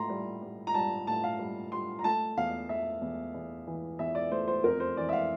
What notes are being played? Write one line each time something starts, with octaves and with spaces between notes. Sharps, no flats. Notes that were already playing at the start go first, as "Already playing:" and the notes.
Already playing: A2 A#5 C6
G3
G3
A#5
G3 A5
A2 A5
F5
G3
G3 C6
A#5
A3 A5
E2 F5
A3 E5
E2
E2
E3
E2 E5
D5
A3 C5
C5
F2 A#4
C5
E3 D5
E5
F5